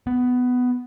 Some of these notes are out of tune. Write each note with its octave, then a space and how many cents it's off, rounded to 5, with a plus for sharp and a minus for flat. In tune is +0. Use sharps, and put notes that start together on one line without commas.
B3 +10